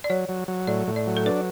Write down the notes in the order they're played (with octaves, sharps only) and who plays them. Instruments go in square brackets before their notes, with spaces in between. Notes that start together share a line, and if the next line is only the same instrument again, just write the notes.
[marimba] D5
[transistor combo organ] F#3 [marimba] C#5
[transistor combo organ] F#3
F#3
[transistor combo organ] A2 [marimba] D5
[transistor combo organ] A2
[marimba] D5
[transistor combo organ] F#3
[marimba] A4
[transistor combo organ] D4 [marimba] B4